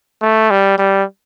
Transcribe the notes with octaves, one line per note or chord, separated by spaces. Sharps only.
A3
G3
G3